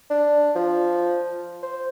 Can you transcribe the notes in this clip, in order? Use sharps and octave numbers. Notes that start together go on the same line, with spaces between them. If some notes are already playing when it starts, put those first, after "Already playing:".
D4
F3
C5